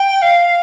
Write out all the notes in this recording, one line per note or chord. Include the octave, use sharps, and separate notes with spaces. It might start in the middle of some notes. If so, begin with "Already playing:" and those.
Already playing: G5
F5